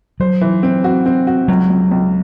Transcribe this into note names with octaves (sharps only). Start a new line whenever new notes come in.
F#3 C5
E3
C4
F#4
C4
F#4
C#2 F#3
C#2
C#2